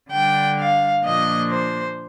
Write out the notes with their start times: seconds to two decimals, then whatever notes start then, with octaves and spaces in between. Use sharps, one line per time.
0.11 D3 G3 D4 G5
0.58 F5
1.03 A#2 F3 A#3 D4 D#5
1.50 C5